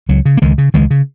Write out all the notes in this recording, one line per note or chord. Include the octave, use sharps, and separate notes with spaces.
C#2 F#3
C#3
A#3
C#2 D#3 G#3
C#3
C#2 D#3 G#3
C#3